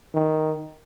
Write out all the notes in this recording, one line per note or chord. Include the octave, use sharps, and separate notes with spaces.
D#3